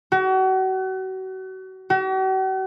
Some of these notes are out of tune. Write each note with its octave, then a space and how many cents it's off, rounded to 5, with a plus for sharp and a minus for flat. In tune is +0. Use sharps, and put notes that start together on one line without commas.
F#4 +35
F#4 +45